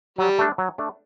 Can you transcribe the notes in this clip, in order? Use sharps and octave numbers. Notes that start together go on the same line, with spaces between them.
F#3 G3
A3 D4
F#3
A3 D4